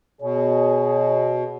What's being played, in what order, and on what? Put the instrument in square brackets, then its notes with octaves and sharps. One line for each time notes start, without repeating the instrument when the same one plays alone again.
[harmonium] B2 [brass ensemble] G#4 C#5